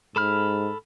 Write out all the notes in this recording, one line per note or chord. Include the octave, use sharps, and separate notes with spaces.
G#2 A4 B5 F6